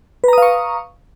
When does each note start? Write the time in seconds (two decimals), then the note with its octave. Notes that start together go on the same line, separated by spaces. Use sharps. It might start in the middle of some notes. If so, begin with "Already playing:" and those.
0.24 B4
0.28 A#5
0.33 D#6
0.38 F5
0.42 C#6